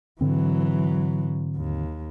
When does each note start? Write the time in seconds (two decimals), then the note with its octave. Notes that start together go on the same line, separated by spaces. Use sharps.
0.21 G#2 D3 E3 F#3 C4
1.57 D#2